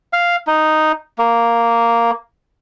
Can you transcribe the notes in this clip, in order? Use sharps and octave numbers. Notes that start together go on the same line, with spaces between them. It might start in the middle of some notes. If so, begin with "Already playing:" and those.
F5
D#4
A#3